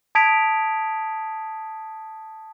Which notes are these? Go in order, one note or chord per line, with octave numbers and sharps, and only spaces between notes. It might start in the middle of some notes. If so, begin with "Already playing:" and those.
A5 D#6 G#6 B6 D7 F7